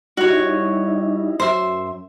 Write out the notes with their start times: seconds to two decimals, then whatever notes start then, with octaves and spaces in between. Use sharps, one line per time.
0.17 G3 D#4 E4 F#4 C#5
1.40 F#2 C5 E5